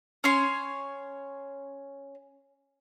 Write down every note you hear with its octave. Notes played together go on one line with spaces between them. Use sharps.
C#4 C#5 C6